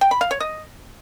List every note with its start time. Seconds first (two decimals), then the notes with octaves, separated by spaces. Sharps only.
0.01 G5
0.11 B5
0.21 F5
0.31 C#5
0.40 D#5